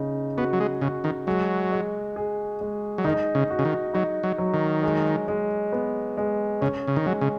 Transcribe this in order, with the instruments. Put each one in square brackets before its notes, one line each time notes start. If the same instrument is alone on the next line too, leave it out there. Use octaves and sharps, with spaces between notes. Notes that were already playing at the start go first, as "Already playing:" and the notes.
Already playing: [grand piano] C#3 D#4
[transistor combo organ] B3 [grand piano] F#4
[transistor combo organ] F#3
G#3
[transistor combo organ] C#3 [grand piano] F#4
[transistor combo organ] D#3
[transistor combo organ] F#3 [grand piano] G#3
[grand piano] G#3
G#4
G#3
[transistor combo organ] F#3
[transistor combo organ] D#3 [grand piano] D#4
[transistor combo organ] C#3
[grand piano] F#4
[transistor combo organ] C#3
D#3
[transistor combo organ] F#3 [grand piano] D#4
[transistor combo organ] F#3
[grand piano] F#3
[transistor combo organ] D#3
[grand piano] G#3
G#3
B3
G#3
[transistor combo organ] C#3 [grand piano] C#4
[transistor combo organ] C#3
D#3
[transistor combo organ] F#3 [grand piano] G#3
[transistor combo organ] C#3